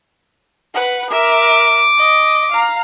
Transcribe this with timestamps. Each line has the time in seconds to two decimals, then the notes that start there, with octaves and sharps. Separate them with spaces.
0.74 B4 F#5
1.11 A#4 E5 D6
1.98 D#5
2.52 F5 A#5